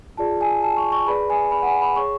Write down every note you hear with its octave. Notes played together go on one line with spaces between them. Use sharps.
F4 G#4 D5 A5
G#5
A5
C#6
C#6
G#4 B4 D5 B5
G#5
B5
F#5
G#5
B5
G#4 C#5 C#6